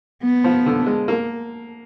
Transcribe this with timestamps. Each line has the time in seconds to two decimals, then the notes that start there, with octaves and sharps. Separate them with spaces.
0.23 B3
0.44 F3
0.66 D3
0.86 G#3
1.08 A#3